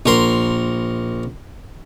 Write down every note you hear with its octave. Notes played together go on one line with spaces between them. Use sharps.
A#1 A#4 C6